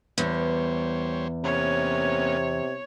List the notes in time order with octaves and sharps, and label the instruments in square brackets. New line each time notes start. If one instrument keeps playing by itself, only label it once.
[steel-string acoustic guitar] E2 [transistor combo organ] G3 C5 C#5
[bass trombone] C3 [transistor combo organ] A#3 B3 C#4 [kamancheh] C#5